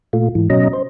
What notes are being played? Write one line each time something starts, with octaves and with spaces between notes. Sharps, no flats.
A#2 A3 F4
G#2 E3
B2 F#3 C#4 D#5 A#5
C5